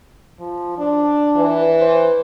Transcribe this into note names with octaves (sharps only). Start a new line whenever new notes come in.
F3
D4
E3
C5